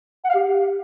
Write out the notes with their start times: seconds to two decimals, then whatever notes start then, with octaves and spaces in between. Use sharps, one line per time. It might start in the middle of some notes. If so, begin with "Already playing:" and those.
0.24 F#5
0.29 F5
0.34 G4